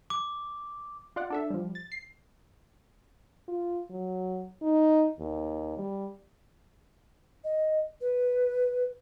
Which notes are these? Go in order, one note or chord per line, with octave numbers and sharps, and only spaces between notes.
D6
F4 D5 F#5
D4 A4 E5
F3 G3
A6
C7
F4
F#3
D#4
D#2
G3
D#5
B4